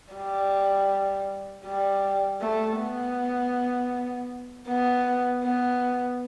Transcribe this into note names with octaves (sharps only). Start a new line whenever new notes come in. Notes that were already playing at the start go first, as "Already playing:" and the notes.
G3
G3
A3
B3
B3
B3